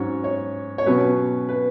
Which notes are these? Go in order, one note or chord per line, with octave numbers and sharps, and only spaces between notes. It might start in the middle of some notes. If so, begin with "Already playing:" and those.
Already playing: G#2 F#3 C#4 C#5
C#5
C#5
B2 F#3 C#4 B4
B4